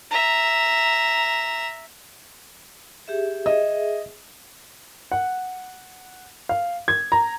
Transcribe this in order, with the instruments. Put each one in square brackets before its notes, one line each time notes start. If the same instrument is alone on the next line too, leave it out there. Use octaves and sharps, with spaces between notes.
[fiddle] E5 A#5
[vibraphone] G4 G#4 E5
[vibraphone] G#4 E5 [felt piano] D#5
[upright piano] F#5
F5
G#6
A#5